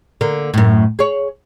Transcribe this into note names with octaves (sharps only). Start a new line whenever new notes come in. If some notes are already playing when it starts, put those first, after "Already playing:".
D3 A#3
F#2 A2
G#4 C#5